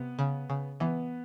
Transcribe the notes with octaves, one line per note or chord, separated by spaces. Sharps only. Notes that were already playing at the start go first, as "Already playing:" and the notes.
Already playing: C3 B3
C#3
C#3
E3 B3